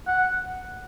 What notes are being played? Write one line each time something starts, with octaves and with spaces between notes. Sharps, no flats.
F#5